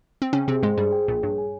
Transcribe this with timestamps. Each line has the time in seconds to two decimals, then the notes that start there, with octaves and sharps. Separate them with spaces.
0.22 C4
0.33 C#3 C#4 G5
0.48 C3 C4 G#4
0.63 G#2 G#3 C5
0.77 G2 G3 G#4
0.92 G5
1.07 A#1 A#2 G#4
1.23 G2 C#5
1.38 G#5